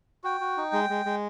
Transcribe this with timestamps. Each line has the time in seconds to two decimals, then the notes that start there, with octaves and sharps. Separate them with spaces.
0.24 F#4 G5
0.41 F#4
0.57 D#4
0.73 G#3
0.90 G#3
1.06 G#3